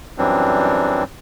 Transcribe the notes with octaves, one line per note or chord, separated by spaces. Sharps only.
F#2 E3 F#3 G3 C4 D4